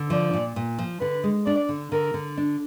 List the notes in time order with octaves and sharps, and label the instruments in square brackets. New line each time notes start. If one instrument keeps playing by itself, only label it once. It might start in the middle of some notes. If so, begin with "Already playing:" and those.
Already playing: [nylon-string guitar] D3
[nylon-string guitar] F3 [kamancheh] D5
[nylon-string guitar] A#2
A#2
F3
[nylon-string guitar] D3 [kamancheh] B4
[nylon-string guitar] G#3
[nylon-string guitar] D4 [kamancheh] D5
[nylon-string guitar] D3
[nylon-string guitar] D3 [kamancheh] A#4
[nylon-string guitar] D3
D4